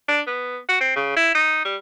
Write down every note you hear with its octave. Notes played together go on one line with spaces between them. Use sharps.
D4
B3
F#4
C4
C#3
E4
D#4
G3